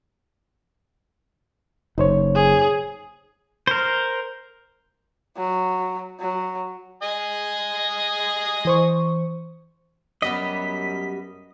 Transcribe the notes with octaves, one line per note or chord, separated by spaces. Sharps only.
F#1 D#4 C5 C#5
G#4
A#4 C5
F#3
F#3
D#5 G#5 D#6
E3 C5 C#6
F#2 G3 B3 G4 D#5 B6